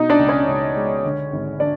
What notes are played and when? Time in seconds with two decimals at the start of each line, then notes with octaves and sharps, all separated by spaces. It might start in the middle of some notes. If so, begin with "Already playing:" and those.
Already playing: B2 D#4 D#5
0.10 D4 D5
0.19 C#2
0.29 C#4 C#5
0.47 C#2
0.76 G#3
1.04 D3
1.32 G#1
1.60 D3 D4 D5